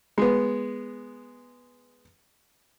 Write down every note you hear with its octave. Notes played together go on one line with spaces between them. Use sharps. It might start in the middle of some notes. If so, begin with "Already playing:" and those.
G#3 B3